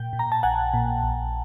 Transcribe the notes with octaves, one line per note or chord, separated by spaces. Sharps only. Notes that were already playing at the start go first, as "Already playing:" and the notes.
Already playing: A#2 G5
A#2
A#5
A5
A#1 F#5 G#5
A#2
A#1